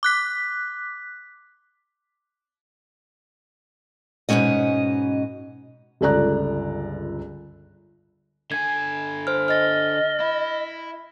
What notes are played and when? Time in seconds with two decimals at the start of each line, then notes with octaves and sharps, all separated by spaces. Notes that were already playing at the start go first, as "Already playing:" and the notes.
0.03 D6 F#6 B6
4.29 G#2 B2 D#3 A3 C#4 D#5
6.01 G1 C#2 A4 D5 A#5 F#6
8.52 D3 G#5 G#6
9.27 C5 F6
9.48 D#5 F6 A6
10.20 E4